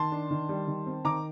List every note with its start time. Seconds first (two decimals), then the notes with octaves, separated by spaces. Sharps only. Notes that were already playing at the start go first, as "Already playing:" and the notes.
Already playing: D#3 A5 C6
0.12 D4
0.31 D#3
0.49 G3
0.68 D#3
0.86 C4
1.05 D#3 A#5 D6